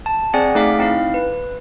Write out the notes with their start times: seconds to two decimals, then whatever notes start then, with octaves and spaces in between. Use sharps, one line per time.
0.06 A5
0.34 C4 G#4 D5 F#5 G#5
0.55 A3 D#4 G#4 F5 D6 B6
0.79 C4 D#4 E4 F5
1.14 B4